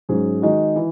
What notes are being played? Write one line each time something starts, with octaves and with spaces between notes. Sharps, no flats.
G#2 F#3 C#4 G#4
D#3 G#3 D#4 F#4
E3